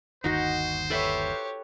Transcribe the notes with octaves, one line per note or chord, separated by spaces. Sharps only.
G1 D#2 D#3 D#4 F#4 C5 D#5
G4 A4 B4 C#5 E5